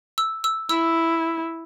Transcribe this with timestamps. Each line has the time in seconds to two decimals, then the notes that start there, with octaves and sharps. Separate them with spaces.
0.18 E6
0.44 E6
0.69 E4 E6